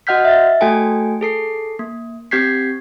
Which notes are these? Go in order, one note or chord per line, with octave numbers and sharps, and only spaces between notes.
F#4 D#5 F#5 F6 G6 B6
E5 A6
A3 F#4 A4 G5 G#5
G#4 A4 C7
A#3
C4 G4 G6 G#6 B6 C7